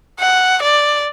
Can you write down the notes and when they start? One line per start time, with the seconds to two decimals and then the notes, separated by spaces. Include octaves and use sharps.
0.20 F#5
0.62 D5